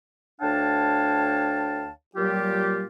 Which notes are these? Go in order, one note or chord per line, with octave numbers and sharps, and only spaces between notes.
D2 D4 C#5 F5 G5 A5
A#2 F#3 G3 F4 G4